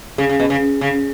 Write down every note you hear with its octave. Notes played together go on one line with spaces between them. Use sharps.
C#3 G#4
C#3
B2
C#3
C#3